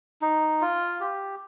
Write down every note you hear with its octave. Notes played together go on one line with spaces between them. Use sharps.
D#4
F4
G4